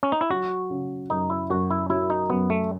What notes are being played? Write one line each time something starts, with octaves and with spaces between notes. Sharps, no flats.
C#4
D#4
E4
F#3 F#4
C#3
F#2 D#4
E4
F#2 F#4
E4
F#3 E4
D#4
F#2 B3
A3